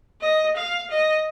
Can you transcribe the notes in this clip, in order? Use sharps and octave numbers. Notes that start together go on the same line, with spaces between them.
D#5
F5
D#5